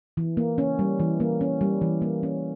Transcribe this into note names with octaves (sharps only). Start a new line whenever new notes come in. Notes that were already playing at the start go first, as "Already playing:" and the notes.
E3
A#3
C#4
G3
E3
A#3
C#4
G3
E3
A#3
C#4